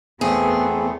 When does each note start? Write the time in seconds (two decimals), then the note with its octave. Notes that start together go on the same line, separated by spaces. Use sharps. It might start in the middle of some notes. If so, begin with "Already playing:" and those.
0.21 E2 A3 B3 C4 G#4